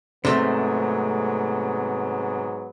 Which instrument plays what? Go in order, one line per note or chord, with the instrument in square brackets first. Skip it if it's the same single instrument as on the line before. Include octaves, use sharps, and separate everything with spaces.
[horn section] G#2 F#3 B3 [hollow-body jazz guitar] C3 A3